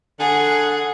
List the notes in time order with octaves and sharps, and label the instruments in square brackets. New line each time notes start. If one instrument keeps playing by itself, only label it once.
[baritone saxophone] D3 [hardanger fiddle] G#4 [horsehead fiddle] F#5